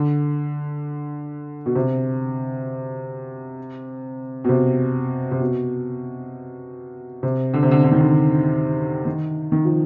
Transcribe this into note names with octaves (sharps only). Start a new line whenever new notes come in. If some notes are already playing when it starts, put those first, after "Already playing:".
Already playing: D3
B2
C3
B2
C3
C3
B2
C3
D3
C3
D3
D3
D#3
D3
D#3
D#3
F3